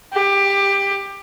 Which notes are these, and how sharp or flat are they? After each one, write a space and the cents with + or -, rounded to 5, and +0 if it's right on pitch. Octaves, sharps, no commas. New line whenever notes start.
G4 +15